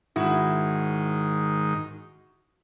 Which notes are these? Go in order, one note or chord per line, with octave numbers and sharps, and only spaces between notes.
G#2 D#3 E4 F#4